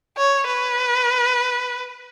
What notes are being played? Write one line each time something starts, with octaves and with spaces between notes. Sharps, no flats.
C#5
B4